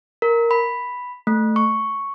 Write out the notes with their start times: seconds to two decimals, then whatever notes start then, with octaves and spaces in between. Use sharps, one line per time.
0.22 A#4
0.51 B5
1.27 A3
1.56 C#6